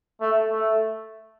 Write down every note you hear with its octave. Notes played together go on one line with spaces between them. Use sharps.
A3
A3